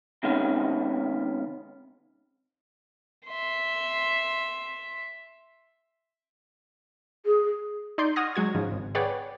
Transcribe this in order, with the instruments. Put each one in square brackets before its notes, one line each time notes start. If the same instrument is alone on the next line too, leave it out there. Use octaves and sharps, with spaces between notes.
[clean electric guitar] C3 D#3 G#3 B3 C#4
[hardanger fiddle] E5 C6
[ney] G#4
[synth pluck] D#4 D5 C6 G6
F#5 C#6 D#6 F6 G#6 A#6
F#3 G#3 F#4 G#6
G#2 C#3 F3
G#1
G#4 B4 C#5 D5 F#5 G5